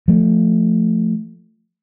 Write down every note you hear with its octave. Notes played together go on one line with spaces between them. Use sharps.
F3 A3